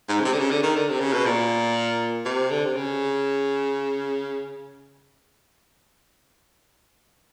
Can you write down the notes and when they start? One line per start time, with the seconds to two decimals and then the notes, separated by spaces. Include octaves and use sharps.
0.09 G#2
0.20 C#3
0.25 C3
0.33 D3
0.38 C#3
0.51 D3
0.63 D#3
0.76 D3
0.88 C3
1.00 C#3
1.13 B2
1.26 A#2
2.25 C3
2.50 D3
2.65 C3
2.76 C#3